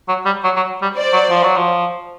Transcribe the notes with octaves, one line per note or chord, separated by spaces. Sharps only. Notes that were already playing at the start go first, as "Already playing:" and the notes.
F#3
G3
F#3
F#3
G3
C5 D5
F#3
F3
F#3
F3